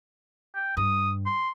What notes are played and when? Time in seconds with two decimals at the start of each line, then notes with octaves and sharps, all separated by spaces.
0.55 G5
0.77 G2 D#6
1.26 C6